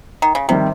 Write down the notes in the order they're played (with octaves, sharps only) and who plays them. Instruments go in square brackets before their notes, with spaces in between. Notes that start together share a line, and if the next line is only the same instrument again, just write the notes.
[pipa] D#3
C#3
[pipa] C3 [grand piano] D#3 G3 C4 G4